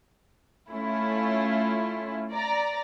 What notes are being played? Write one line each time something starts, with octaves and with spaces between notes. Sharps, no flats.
A3 C#4 E4 F4
D5 A#5